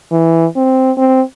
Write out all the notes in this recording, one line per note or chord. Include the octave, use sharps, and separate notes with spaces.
E3
C4
C4